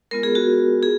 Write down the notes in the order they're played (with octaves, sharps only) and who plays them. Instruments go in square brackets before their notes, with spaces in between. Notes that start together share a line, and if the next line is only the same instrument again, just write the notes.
[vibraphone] G#3 B3 F4 A#4
G#4
F#4
F4 G#4